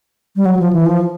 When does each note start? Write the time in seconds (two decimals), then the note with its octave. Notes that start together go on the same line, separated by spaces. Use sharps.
0.36 G3
0.46 F#3
0.59 F3
0.73 E3
0.86 F3